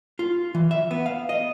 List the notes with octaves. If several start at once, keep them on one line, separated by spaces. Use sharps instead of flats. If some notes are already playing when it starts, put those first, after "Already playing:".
F4
E3
E5
B3
F5
D#5